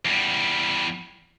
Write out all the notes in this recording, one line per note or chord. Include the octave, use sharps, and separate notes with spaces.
E2 G3